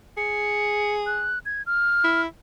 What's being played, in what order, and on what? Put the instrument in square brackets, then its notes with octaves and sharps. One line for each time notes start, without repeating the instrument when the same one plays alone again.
[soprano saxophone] G#4 [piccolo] C#7
[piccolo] F#6
G#6
F6
[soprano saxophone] E4